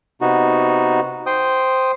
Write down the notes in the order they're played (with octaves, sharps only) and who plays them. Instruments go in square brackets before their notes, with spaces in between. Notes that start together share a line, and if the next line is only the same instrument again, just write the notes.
[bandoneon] C3 B3 D#4 F#4
C5 G5 D#6